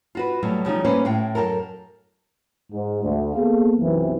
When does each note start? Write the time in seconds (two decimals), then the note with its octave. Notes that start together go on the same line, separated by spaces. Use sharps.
0.15 F4 F#4 B4
0.43 B2 F#3 G3 A3
0.65 C#3 F3 G3 D#4
0.85 G3 A#3 C#4 B4 C5
1.05 A2 F5 G5
1.35 F#2 B2 A4 A#4
2.72 G#2
3.03 D2
3.35 A#3 B3 G#4 A4 F5
3.79 B1 F#2 C3 E3